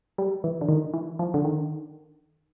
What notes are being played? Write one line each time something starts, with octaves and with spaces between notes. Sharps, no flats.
G3
E3
D3
D#3
E3
F3
D3
D#3